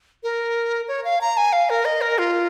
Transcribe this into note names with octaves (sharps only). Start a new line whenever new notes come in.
A#4
C#5
F5
A#5
G#5
F5
A#4
D#5
A#4
F4